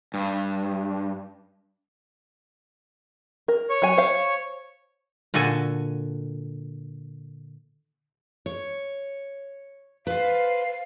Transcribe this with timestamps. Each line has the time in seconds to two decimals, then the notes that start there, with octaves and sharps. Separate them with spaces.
0.14 G2
3.48 A#4
3.70 C#5 C#6
3.82 F#3 G#5
3.97 C5 F5
5.34 A#2 D3 F#4 A4 G#5
8.46 C#5
10.07 B4 C5 F5